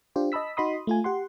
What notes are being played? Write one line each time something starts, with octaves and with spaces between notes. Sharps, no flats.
D4 F4 G4 C5
D#5 A5 B5 E6 B6
D#4 F#4 D#5 B5 C6 D#6
A3 F4 G#5
G4 F#5 C6